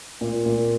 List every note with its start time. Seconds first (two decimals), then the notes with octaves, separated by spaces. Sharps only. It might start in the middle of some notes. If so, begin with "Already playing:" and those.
0.21 A#2
0.46 A#2